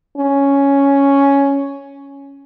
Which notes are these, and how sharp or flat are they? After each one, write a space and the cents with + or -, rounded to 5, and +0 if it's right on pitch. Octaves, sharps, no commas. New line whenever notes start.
C#4 +5